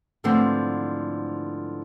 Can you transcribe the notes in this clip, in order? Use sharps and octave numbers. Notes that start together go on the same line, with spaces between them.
G#2 D3 E3 F3 A3 C4